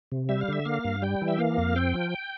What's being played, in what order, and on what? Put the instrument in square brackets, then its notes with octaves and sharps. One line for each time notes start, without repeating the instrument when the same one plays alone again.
[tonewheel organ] C3
G3 E5
F5
D3 E5
A#3 F5
G2
G3 G5
E3
E5
A#3 F5
F2
C4 G5
F3